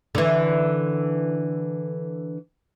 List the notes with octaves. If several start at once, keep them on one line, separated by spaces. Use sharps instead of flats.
D3 E3